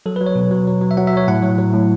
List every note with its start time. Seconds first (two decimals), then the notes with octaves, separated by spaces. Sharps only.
0.06 F#3 A4
0.16 B4
0.21 F#3
0.26 C#5
0.35 B2
0.51 F#3
0.67 F#3
0.81 F#3
0.91 E5
0.97 F#3 F#5
1.07 E5
1.13 F#3 C#5
1.28 A2 F#5
1.42 F#3
1.58 F#3
1.73 A2